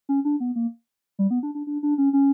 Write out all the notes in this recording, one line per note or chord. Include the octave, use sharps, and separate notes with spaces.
C#4
D4
B3
A#3
G3
B3
D4
D4
D4
D4
C#4
C#4